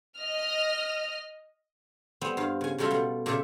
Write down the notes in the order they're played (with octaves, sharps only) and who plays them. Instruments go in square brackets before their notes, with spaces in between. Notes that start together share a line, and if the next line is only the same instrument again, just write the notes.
[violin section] D#5 F6
[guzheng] G3 B3 C4
G2 F5
C#3 G#5
C#3 F#3 G3 F4 A4 E5
B2 G3
A#2 C#3 G4 A4 E5